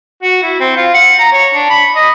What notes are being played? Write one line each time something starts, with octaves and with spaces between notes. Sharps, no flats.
F#4
E4
C4
F4
F#5
A#5
C#5
D4
B5
D#5